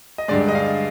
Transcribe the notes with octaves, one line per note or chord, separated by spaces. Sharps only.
D#5
G2 D3 G#3 D5
D#5
F5